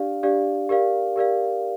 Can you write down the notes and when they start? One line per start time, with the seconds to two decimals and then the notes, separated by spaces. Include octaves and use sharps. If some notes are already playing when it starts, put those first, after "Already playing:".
Already playing: D4 G4 D5 F5
0.23 D4 G4 D5 F5
0.69 G4 A#4 D5 F5
1.16 G4 A#4 D5 F5